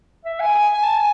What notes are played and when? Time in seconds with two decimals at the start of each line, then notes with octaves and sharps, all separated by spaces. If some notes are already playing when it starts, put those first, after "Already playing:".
0.25 E5
0.40 G#5
0.54 G#5
0.74 G#5
0.83 A5
0.97 G#5